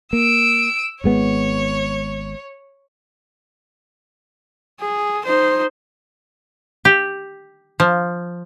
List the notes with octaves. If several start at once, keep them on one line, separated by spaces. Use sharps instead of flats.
A#3 E6 D7
G#1 G#3 B3 C#5
G#4
D#4 C5
G4
F3